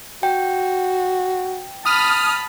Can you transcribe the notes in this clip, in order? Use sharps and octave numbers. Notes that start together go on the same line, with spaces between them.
F#4 G5
A5 B5 D#6 F6